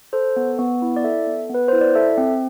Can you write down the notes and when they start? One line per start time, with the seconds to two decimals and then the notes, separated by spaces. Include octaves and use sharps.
0.13 A4 C5
0.36 B3
0.59 B3
0.82 E4
0.96 D5
1.04 A4 E5
1.27 B3
1.49 B3 B4
1.68 E4 C5
1.81 D5
1.95 A4 E5
2.18 C4